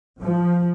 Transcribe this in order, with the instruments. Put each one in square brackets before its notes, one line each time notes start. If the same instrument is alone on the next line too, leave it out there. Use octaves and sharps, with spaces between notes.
[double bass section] F3